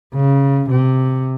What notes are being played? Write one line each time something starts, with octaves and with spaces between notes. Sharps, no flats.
C#3
C3